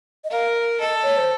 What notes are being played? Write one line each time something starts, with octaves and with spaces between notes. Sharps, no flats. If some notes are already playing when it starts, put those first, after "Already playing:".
D#5
A#4 F5
A4 D#5
C#5
C5